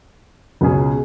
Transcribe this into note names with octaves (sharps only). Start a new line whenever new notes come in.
C#2 B2 F#3 C#4 G#4